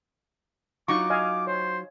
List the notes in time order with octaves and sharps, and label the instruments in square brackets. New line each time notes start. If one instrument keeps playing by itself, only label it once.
[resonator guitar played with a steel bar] F#3 D#4 F4 [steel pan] C#6 [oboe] D6
[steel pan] D#5 F5 G#5
[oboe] C5 [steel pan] C#5